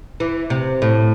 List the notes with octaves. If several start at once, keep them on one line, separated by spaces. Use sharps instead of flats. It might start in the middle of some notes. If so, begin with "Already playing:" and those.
E3
C3
A2